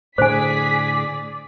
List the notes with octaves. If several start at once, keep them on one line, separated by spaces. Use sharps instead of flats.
A2 D3 G#4 C5 D5 G#5 B6